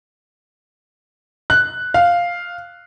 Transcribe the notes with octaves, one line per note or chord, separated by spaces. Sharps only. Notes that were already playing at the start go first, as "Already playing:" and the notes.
F#6
F5